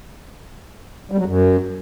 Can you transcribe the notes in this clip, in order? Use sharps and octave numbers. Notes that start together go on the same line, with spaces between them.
G3
F#3
F#2